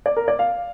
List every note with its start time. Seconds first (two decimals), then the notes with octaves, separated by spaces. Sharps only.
0.06 D5
0.17 A#4
0.28 D5
0.39 F5